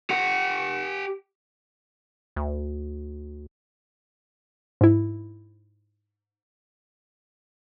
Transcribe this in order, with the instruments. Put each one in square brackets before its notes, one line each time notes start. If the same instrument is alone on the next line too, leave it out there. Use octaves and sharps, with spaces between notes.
[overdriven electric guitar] G4 F#5
[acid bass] D2
[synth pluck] G#2 E4